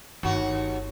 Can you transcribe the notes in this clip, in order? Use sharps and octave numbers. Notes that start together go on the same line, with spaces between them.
G1 D#2 F#4